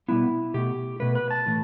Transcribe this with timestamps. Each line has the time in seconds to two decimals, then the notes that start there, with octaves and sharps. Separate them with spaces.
0.08 B2 G3 B3 E4
0.54 B2 A3 G4
1.00 B2 A3 B4
1.15 B4
1.31 A5
1.46 A2 E3 A3